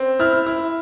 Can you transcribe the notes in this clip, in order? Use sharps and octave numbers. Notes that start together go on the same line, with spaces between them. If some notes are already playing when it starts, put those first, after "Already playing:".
Already playing: C4
E4 F6
E4